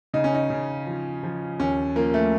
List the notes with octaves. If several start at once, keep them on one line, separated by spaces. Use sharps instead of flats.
C#3 D#4
C#4
D#4
C#3
F3
F3
D#2 C#4
F3 A#3
A3